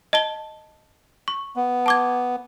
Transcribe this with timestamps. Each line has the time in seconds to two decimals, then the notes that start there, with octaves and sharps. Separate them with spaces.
0.13 D#5 A5 G7
1.28 C#6
1.56 B3
1.86 A5 D6 G#6